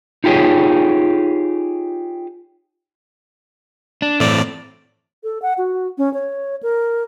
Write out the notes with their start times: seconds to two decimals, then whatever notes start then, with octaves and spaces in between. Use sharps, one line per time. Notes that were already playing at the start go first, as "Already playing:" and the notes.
0.24 D#4 F4 G4 G#4 C#5
4.02 D4
4.20 A2 E3 C4 D5
5.24 A4
5.42 F#5
5.58 F#4
5.98 C#4
6.14 C#5
6.63 A#4